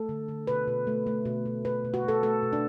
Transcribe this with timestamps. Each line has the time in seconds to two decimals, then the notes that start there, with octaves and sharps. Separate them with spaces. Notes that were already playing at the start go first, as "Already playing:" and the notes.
Already playing: A3 A4
0.09 D3
0.28 D3
0.47 B2 B4
0.68 B2
0.87 A3
1.07 A3
1.25 B2
1.45 B2
1.65 B2 B4
1.85 B2
1.94 F#4
2.04 A3 A4
2.23 A3 A4
2.43 B2
2.53 D4